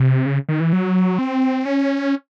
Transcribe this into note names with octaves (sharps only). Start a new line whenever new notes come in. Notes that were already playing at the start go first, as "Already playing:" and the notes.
Already playing: C3
C#3
D#3
E3
F#3
C4
C#4